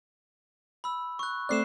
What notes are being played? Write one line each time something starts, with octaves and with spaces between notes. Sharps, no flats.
B5 E6
C#6 F#6
A3 C4 D5 F#6 C7 E7